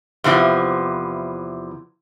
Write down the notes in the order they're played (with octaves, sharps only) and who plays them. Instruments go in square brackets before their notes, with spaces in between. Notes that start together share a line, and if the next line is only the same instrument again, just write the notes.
[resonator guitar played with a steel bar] E2 C3 E3 F3